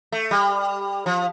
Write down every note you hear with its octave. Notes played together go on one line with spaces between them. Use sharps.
A3
G3
F3